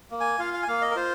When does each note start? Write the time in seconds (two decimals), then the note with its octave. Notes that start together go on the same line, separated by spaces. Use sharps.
0.11 A#3
0.20 G#5
0.39 F4 F5
0.54 F5
0.63 G#5
0.68 A#3 F5
0.82 D#5
0.91 A#4
0.96 F4 C5